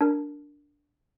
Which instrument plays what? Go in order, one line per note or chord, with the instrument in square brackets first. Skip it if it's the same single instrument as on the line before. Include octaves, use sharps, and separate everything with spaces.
[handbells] D4 A#4